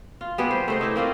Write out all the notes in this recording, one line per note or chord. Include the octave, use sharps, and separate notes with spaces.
F4
G3 B3 G#4 B4
C5
A3 C5 D#5
D#4 E4 G4
A#3 C4 F4 D#5